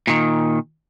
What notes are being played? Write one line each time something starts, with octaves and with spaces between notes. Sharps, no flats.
A#2 D#3